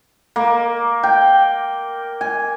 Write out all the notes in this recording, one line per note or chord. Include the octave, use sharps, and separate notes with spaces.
A#3
G5
G#5